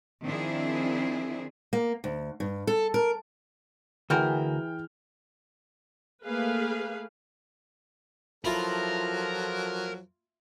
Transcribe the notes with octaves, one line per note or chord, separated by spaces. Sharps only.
D#3 F3 C4 D4 E4 G#4
A#3
D2
G2
A4
A#4
D2 E3 F#4 G#4 A#4 G5 F6 G6
A3 A#3 G#4 B4 F5
F3 F#3 E4 F4 A4 A#4